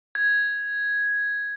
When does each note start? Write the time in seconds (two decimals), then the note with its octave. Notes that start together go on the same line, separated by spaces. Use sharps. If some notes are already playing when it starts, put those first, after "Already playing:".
0.15 G#6